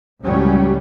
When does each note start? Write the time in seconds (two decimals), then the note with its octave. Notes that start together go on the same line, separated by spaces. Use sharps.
0.23 C#2 A2 F#3 G3 C#4